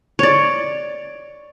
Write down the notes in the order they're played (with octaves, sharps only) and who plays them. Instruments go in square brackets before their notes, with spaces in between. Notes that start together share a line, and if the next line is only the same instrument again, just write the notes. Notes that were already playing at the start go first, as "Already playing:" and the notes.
[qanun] C#5 D5